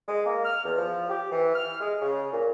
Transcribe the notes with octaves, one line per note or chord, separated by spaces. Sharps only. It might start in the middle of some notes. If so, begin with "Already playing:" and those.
G#3
A#3
F6
E2
F3
G4
E3
F6
G#3
C#3
A#2